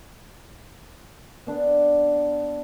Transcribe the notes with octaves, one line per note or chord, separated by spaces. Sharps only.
B3 D4 D5